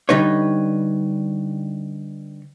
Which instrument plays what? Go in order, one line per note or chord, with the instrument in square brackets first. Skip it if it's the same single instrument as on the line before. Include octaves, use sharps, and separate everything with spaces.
[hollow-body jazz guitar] D3 G3 D#4 B4 C#5